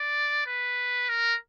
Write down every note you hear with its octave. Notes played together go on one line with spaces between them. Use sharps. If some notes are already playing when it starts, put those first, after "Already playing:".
Already playing: D5
B4
A#4